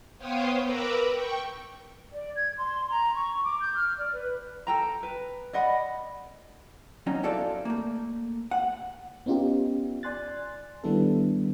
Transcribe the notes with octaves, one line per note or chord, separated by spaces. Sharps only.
B3 C5 C#5 F5 G5 D#6
A#4 B4 A#5 B5 D6 E6
G5 C#6
D5
G#6
C6
A#5
C#6
D6
G6
F6
D5
B4
A4 G5 A#5
B4
D5 D#5 F#5 B5
B2 F#3 C#4 D#4
E4 F#4 A4 C5 D5 F5
A3 A#3
F#5
B3 C#4 D#4 F4 G4
D5 G#5 C6 F#6 A6
D#3 G3 B3 D4 E4 A4